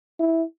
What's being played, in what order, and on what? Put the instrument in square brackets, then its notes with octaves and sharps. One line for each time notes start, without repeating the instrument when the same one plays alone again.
[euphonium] E4